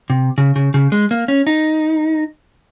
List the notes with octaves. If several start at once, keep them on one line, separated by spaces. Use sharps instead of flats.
C3
C#3
C#3
C#3
G#3
A#3
C#4
D#4